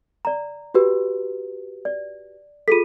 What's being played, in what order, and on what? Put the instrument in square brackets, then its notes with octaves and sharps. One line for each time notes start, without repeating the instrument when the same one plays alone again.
[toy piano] D5 A#5
[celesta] F#4 G4 B4
[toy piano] D5
[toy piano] F4 G#4 A4 [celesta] B6 D#7